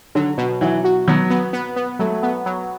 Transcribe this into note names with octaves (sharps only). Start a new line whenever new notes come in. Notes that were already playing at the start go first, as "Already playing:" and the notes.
D3 F#3
B2
E3 F#3
F#4
F#3 B3
B3
B3
B3
F#3 A3
B3
F#3